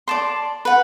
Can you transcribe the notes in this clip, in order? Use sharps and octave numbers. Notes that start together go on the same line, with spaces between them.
D5 A5 C6
B4 F#5